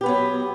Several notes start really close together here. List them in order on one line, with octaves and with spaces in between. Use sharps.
G4 B4 B3 F#3